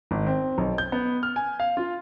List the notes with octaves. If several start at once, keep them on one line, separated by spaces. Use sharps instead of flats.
G#1
C4
B1
G6
B3
F6
G#5
F5
F4